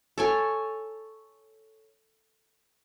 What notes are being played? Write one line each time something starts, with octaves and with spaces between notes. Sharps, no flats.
A4 C#5 G#5